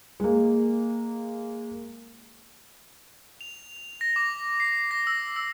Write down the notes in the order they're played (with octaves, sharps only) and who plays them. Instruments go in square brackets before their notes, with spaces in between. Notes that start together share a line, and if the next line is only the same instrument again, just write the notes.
[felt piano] G#3 A#3
[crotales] F7
A#6
D6
C7
A#6
E6
E6